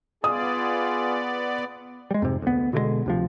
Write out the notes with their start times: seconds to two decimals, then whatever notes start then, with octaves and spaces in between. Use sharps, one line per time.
0.24 B3 F4 G#4 D5 D#6
2.11 G3 G#3
2.22 F2 G#2 C3
2.42 D2 B3
2.73 B2 D3 E3 G#3
3.06 D2 C3 F3